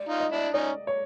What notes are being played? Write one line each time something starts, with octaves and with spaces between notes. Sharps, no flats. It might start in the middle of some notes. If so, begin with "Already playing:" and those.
Already playing: D5
D#4 F4
D#5
D4 E4
C#4 D#4 D5
C#5